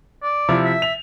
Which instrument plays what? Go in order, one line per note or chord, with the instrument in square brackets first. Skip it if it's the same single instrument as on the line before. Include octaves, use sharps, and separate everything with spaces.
[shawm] D5
[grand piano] C3 F3 E4
[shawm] E5
[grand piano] F7